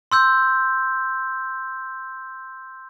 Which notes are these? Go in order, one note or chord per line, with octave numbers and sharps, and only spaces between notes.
C6 E6 G6